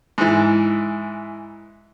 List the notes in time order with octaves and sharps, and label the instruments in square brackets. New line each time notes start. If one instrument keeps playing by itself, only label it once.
[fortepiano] G#2 E3